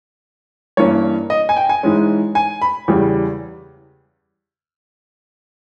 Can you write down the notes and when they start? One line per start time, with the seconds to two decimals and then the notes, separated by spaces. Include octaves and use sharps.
0.77 G2 E3 A#3 C#4 C#5
1.30 D#5
1.49 G#5
1.56 G5
1.69 G#5
1.83 G#2 E3 G#3 C#4
2.35 G#5
2.62 B5
2.88 E2 C#3 G3